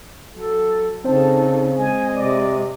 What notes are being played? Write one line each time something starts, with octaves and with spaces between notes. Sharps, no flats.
F#3 A4
C#3 C4 D#4 A4 C5 A5
G#3 D#5 G#5
C3 D5